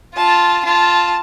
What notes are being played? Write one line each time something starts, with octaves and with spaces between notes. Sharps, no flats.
F4 A5
F4 A5